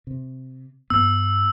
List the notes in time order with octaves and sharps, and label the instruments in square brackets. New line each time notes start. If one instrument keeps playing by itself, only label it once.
[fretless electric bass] C3
[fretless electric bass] G2 B3 [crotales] E6